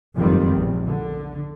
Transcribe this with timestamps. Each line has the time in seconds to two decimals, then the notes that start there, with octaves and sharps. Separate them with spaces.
0.16 F#1 F2 G#2 D#3 G3 C4
0.54 A#1 E2
0.86 D3